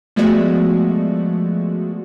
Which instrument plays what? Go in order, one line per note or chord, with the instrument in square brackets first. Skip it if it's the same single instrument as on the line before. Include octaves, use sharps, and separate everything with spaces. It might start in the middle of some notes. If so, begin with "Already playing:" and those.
[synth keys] F3 G#3 A3 B3 F#4 D5